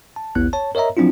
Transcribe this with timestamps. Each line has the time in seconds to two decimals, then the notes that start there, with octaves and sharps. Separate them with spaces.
0.16 A5
0.35 A1 D#2 B3 E4 F#6
0.53 C#5 A5
0.75 A#4 C#5 D#5 E5 A#5
0.97 F3 F#3 C4 D4 E4 F4